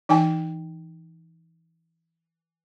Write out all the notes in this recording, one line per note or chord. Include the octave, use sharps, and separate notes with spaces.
E3 D#4 G5 G#5